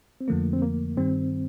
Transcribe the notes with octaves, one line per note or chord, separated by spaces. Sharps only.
C4
F2 D3 F3 A3 A#3
C4
A#3
G2 D#3 G3 C4